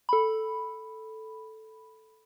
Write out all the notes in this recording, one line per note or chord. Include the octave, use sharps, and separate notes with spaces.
A4 B5